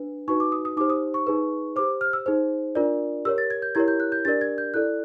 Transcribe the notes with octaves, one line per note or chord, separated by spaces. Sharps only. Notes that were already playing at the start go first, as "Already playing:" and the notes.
Already playing: D4 B4
D#4 F#4 B4 C#6
D6
D#6
D#6
D#4 G4 C5 D6
D#6
C#6
D#4 G#4 B4
G4 C5 D6
F6
E6
D#4 G#4 C5
D4 F4 A#4 D5
G4 A#4 C#5 E6
A6
G#6
G6
E4 G4 A#4 C#5 G#6
G6
F#6
G6
D4 G4 A#4 D5 A6
G#6
G6
E4 A4 D5 F#6